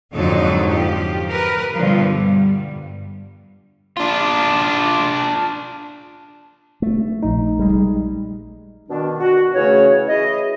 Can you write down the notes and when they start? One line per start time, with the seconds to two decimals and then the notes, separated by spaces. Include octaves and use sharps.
0.13 F2 G#2 D3 F#3 D#4 A4
0.68 F3 G4
1.29 A#4 B4
1.75 G2 B2 D3 F3
2.06 G3
3.97 D4 F4
6.82 A3
7.23 A#1 D#4
7.59 G3 G#3
8.89 B2 D#3 D4
9.19 F#4
9.55 C#3 E3 A3 C#4 F#4 C#5
10.08 E4 G#4 D#5